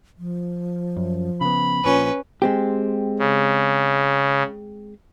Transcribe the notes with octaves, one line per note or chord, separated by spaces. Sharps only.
F3
F#2
C#3 B3 B5
A#1 A#2 F3 C#4 B4
G#3 C4 G4
C#3